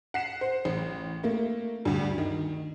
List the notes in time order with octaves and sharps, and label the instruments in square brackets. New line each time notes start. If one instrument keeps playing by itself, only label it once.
[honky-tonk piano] F#5 C7 E7
C5
A1
A3 A#3
D2 G2
D#3